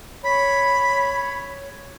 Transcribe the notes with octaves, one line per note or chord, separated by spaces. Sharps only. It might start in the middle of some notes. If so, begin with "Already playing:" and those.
C#5 B5